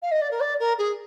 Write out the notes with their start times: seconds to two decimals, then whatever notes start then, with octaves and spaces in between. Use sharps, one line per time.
0.02 F5
0.11 D#5
0.21 D5
0.31 A#4
0.40 D5
0.60 A#4
0.78 G#4